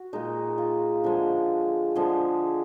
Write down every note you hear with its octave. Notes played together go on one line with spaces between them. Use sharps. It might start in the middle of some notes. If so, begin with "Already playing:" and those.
Already playing: F#4
A#2 G#3 D#4
F4
D3 F3 G#3
D3 F3 G#3